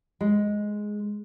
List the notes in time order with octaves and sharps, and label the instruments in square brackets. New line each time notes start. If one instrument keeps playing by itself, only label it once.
[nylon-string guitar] G#3